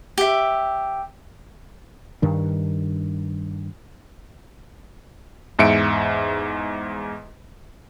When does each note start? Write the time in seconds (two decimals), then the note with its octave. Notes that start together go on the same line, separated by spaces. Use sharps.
0.18 G4 E5
2.22 G2 D#3 D4
5.59 E2 G#2 E5 C#7 D7